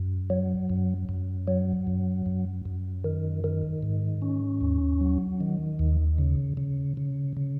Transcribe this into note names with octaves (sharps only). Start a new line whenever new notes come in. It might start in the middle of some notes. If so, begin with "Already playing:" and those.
Already playing: F#2
F#3
F#2
F#2
F#3
F#2
F#2
F#2
D#3
D#3
G#2
C#4
D#2
F#3
D#3
D#2
C#3
C#3
C#3
C#3